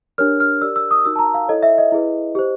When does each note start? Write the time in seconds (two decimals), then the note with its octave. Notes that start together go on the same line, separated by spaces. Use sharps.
0.18 D4 G4 A#4 C#5 F6
0.40 F6
0.61 G4 A#4 D5 E6
0.76 E6
0.91 D#6
1.05 D#4 F#4 A#4 E6
1.16 A5
1.19 A#5
1.34 F5
1.48 E4 A4 C#5 D#5
1.63 E5
1.78 D#5
1.92 E4 G#4 B4
2.35 G4 C5